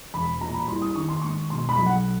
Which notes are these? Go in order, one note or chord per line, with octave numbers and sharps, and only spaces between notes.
E1 B5
A#2 A#5
B5
C2 C6
D#6
D#3 C#6
C6
G#2 C#6
B2 C6
B5
B1
F#5